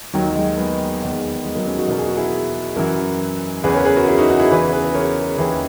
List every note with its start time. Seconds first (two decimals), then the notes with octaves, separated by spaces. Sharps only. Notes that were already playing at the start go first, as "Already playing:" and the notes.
0.14 D#2 D#3 F#3
0.28 F#3
0.36 G#3
0.57 G#3 B3
1.02 E2 D#3
1.45 G#3
1.55 F#3 A#3
1.66 A#3 C#4
1.78 D#4 F#4
1.88 E2 B2 A#4
1.98 G#4
2.07 F#4
2.17 E4 G#4
2.76 F#2 E3 F#4 A#4
3.63 E2 C#3 E3 G#4 B4
3.74 A#4 C#5
3.85 G#4 B4
3.96 F#4 A#4
4.07 E4 G#4
4.18 D#4 F#4
4.30 D#4 F#4
4.40 E4 G#4
4.51 E2 C#3 E3 G#4 B4
4.72 G#4 B4
4.95 A#4 C#5
5.38 D#2 C#3 E3 G#4 B4